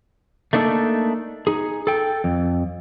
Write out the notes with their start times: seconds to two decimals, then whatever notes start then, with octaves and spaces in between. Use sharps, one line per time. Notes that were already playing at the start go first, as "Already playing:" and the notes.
0.53 A3 A#3 D4 D#4 G4 A4
1.47 D#4 G#4
1.87 A4 G5
2.24 F2